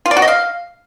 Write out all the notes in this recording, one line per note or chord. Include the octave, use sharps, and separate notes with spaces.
F4
D5
F#4
D#5
F5